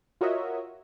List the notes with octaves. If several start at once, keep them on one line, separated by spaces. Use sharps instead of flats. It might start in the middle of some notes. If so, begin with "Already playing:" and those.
F4 F#4 A#4 C#5 D#5 E5